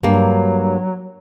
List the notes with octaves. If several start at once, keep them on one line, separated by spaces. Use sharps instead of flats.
G2 F#3 A#3